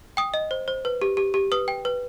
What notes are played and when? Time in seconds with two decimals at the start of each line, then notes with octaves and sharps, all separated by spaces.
0.17 G5 D#6
0.34 D#5
0.51 C5
0.68 C5
0.85 B4
1.02 G4
1.17 G4
1.34 G4
1.52 B4 D#6
1.68 G5
1.85 B4